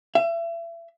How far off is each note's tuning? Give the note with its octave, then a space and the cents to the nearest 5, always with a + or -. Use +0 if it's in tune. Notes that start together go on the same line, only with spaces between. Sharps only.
E5 +35